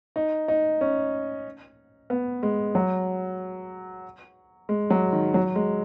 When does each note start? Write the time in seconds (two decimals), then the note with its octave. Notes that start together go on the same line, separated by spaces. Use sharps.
0.16 D#4
0.48 D#4
0.81 C#4
2.10 B3
2.43 G#3
2.75 F#3
4.69 G#3
4.90 F#3
5.13 D#3
5.34 F#3
5.56 G#3